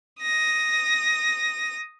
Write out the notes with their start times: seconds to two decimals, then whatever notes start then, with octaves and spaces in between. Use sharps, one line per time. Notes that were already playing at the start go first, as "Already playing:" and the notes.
0.22 D#6 A#6